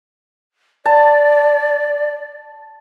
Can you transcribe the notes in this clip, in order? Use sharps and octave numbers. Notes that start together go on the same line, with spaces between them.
D5 A5